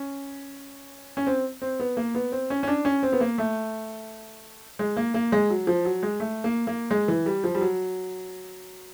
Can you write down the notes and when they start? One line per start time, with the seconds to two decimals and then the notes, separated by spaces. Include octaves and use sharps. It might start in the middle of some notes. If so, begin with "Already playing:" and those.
Already playing: C#4
1.17 C#4
1.27 C4
1.62 C4
1.80 B3
1.97 A#3
2.15 B3
2.32 C4
2.50 C#4
2.63 C#4
2.68 D4
2.85 C#4
3.03 C4
3.12 B3
3.21 A#3
3.38 A3
4.79 G#3
4.97 A#3
5.14 A#3
5.32 G#3
5.50 F#3
5.67 F3
5.85 F#3
6.03 G#3
6.20 A3
6.44 A#3
6.67 A#3
6.91 G#3
7.08 E3
7.26 G3
7.44 F3
7.55 G3
7.61 F#3